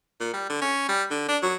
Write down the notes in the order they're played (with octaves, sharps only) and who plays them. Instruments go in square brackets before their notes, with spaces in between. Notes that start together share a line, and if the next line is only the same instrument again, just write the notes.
[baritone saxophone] A#2
G3
D3
C#4
G3
D3
D4
F#3